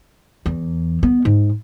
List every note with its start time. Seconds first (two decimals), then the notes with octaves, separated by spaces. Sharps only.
0.46 E2
1.03 B3
1.25 G#2